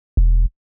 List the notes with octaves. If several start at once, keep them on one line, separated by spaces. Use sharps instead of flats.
E1